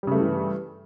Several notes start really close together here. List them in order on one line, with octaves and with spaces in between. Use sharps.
G3 C#3 A3 G2 E3